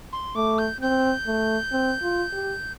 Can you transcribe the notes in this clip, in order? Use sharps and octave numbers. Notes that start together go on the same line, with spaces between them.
C6
A3 D6
G6
C4 G6
A3
C4
F4
G4